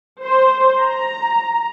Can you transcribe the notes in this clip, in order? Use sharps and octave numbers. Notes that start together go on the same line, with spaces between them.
C5
A#5